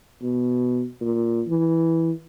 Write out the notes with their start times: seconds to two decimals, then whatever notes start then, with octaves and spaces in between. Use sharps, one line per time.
0.22 B2
1.01 A#2
1.48 E3